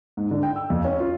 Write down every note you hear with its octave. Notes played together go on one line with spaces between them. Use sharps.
G#2
D3
G5
E6
F2
C#4
F4